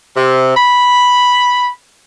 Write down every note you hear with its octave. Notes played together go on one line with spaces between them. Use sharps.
C3
B5